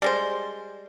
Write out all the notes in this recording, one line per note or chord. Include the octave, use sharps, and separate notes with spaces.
G3 G#3 C5